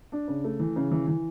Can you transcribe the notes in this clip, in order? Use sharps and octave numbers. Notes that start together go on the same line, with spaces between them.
D4
C#3
A3
E3
C#3
E3
E3